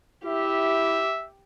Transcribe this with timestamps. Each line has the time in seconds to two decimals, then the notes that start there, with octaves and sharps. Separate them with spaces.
0.25 E4 G4 E5